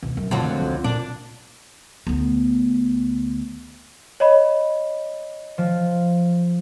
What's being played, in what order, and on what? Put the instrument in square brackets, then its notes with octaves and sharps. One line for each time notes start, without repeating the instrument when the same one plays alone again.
[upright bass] D2 B2
F#2
[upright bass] A#1 A3 [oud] F2 D3 F#3
[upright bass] C#2
[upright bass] A#2 C4 [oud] D4
[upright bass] D2 B3
[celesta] C#5 D#5 B5
[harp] F3